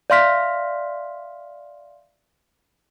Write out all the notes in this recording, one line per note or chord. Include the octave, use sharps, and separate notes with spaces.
D5 E5 F5 C6 F6 B6